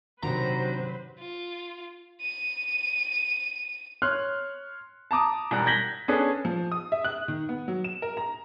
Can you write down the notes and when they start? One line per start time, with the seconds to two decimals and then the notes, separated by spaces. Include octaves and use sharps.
0.23 C3 D#3 F#3 D4 F#4 B4 C5 A#5
1.19 F4
2.22 D#7
4.02 C#5 C6 F6 F#6
5.11 A5 A#5 D6 D#6
5.51 E1 G3 A#5 F#6
5.66 G6 G#6 A#6 B6 F#7 G7
6.08 B3 C#4 D4 G#4 A4 B4
6.45 F3
6.72 D#6
6.92 E5
7.04 F#6
7.28 D#3
7.49 B3
7.68 F#3
7.84 E7
8.02 A#4
8.17 A#5